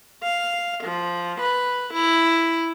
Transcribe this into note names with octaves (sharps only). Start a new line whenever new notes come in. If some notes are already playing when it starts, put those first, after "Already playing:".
F5
F3
B4
E4